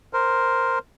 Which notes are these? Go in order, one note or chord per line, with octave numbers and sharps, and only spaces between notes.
A#4 C5